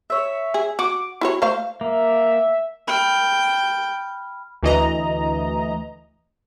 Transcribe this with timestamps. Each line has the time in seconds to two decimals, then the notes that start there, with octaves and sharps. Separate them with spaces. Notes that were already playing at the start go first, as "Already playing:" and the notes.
0.10 C#5 E5
0.54 G#4
0.79 F#4 D6
1.21 E4 F#4 C#5
1.42 A3 C5 F5
1.81 A#3 E5
2.88 G5 B5 F6
4.63 D2 E3 D#5 A#5